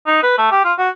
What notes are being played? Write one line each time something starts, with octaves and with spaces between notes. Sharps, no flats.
D#4
B4
A3
G4
F4
F#4